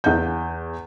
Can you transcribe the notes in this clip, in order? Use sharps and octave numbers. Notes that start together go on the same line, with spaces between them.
E2 G6